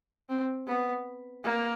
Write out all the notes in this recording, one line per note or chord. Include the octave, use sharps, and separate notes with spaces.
C4
B3
A#3